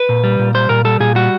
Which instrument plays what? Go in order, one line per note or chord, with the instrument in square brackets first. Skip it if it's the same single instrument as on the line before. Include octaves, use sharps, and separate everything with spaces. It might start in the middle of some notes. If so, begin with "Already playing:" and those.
Already playing: [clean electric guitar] B4
A#2
G3
A#2
G3 C5
A#2 A#4
G3 A4
A#2 G#4
G3 F#4